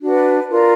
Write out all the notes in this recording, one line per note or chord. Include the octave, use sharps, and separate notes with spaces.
D4 F#4 B4
F4 A#4 D5